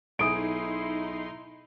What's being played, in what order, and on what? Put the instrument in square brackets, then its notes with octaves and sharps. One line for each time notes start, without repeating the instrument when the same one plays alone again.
[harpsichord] B1 G#4 [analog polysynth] D#4 C6 C7 [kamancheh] E4 [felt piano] D#6 D7